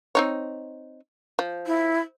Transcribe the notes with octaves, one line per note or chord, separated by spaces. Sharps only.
C4 D#4 C#5
F3
E4